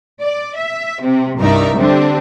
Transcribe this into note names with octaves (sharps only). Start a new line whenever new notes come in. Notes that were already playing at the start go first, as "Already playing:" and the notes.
D5
E5
C3
C2 G2 D#4 A#4 D5 E5
D3 G3 C4 D4 G4